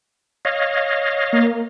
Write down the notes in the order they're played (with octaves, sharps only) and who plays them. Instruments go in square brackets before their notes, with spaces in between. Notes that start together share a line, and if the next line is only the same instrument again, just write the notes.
[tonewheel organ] C#5 D#5 F5
[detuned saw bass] A#3